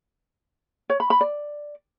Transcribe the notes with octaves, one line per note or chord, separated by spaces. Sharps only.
C#5
B5
B5
D5